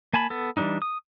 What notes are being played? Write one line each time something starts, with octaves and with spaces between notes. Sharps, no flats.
A#3 G#5 A5 B5
B3 A4
E3 G3 C4 D4 D#4
D#6